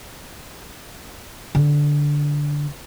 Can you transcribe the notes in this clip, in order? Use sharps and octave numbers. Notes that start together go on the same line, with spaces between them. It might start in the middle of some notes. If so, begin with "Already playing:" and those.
D3